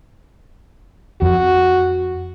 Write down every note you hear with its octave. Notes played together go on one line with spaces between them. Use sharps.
F2 F#4